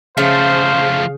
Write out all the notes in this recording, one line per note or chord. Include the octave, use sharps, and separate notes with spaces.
C#3 F3 A3 C5 F5